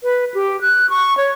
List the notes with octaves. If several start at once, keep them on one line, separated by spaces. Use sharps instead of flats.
B4
G4
F#6
C#6
C#5